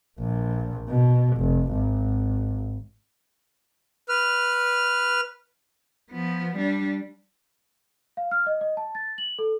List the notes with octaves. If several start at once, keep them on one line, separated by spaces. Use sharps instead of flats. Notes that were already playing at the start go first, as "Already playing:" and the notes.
A#1
B2
F1
G#1
B4 F6
F3 B3
G3 D4
F5
F6
D#5
D#5
A5
A6
F#7
A4